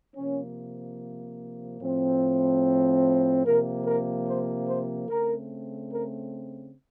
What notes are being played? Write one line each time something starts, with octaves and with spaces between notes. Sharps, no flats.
C3 F3 A#3 C#4
A2 F3 C4
C3 F3 A#3 A#4
A#4
C5
C5
C#3 A3 C4 A#4
A#4